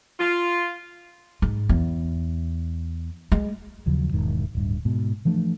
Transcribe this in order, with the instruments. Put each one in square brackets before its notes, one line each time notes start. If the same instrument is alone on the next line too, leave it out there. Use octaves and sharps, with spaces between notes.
[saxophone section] F4
[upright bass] G#2
E2
G#3
[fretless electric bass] D#2 C#3 F3 F#3
E1 G#2 D#3
D1 G2
G#2 B2
E3 F3 A3 D4